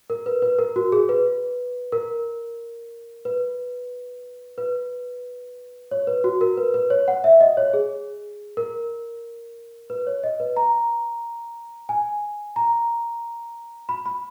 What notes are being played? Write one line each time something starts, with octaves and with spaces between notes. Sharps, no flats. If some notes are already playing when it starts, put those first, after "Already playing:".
A#4
B4
B4
A#4
F#4
G#4
B4
A#4
B4
B4
C#5
B4
F#4
A#4
B4
B4
C#5
F#5
E5
D#5
C#5
G#4
A#4
B4
C#5
D#5
B4
A#5
G#5
A#5
B5
B5